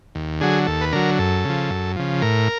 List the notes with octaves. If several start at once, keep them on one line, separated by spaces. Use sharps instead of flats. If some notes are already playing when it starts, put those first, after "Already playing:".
D#2
D3 F#3 G#4
D#2 A4
B4
D3 F#3 A#4
F#2 A4
C#3 F3
F#2
C#3 F3
A2 A#4